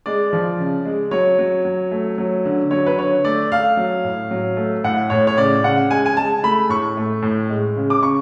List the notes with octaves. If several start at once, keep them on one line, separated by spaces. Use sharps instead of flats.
G#3 D5
F3
C#3
G#3
F#3 C#5
F#3
F#3
A3
F#3
D3
F#3 C#5
B4
D3 C#5
A3 D5
A3 F5
F#3
A2
F#3
A3
A2 F#5
A2 C#5
C#5
C#3 D5
C#3 F#5
G#3 G#5
G#5
G#3 A5
A3 B5
A2 C#6
A3
A2
G#3
C#3
D6
C#3 C#6